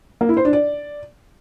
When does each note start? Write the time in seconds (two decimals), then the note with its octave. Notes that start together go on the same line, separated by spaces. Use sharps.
0.21 A#3
0.29 E4
0.37 C5
0.45 D4
0.53 D5